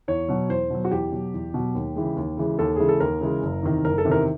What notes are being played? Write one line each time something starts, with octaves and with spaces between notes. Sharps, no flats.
E2 C#5
B2 F#3
E2 C5
B2 F#3
F#4
E2 G4
B2 F#3
E2
B2 F#3
D#2
C#3 E3 G#3
D#2
C#3 E3 G#3
D#2 A4
C#3 E3 G#3 G#4
A4
D#2 A#4
C#3 E3 G#3
F#1
E2 C3 D#3
F#1 A#4
A4
E2 C3 D#3
A#4